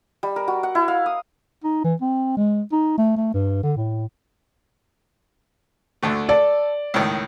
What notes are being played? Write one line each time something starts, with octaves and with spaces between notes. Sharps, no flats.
G3
A#4
F#4
F#5
E4
F5
D#6
D#4
E3
C4
G#3
D#4
A3
A3
G2
D3
A2
D2 D3 A3
A4 D5
C#2 A2 D#3